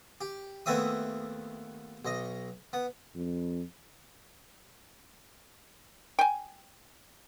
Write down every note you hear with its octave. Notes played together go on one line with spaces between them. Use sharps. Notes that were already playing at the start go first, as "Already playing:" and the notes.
G4
D#2 A3 B3 C4 E5 D#6
B1 D#5
B3
F2
G5 G#5